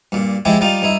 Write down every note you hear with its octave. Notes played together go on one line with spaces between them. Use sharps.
G2 A#2
F3 G#3 E4 G4
G3 D#4 F4 G4
G2 D#4 E4